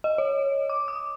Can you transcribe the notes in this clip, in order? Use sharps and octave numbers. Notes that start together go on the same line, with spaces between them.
D#5
C#5
D6
D#6